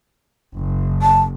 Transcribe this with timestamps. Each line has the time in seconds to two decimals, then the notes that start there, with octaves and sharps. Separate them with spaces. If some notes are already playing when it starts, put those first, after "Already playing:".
0.55 F#1
1.02 A5